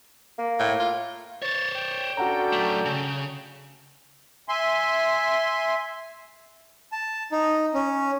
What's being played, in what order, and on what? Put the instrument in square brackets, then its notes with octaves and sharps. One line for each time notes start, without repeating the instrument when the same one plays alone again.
[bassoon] A#3
[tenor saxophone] A2
F4
[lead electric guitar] C5 C#5 [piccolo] A6
[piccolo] G5
[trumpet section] C#4 D4 A4 [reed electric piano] F#4 F#5 A#5
[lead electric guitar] F#3 A3
C#3
[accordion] E5 G#5 C6
[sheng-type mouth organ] A5
D#4
C#4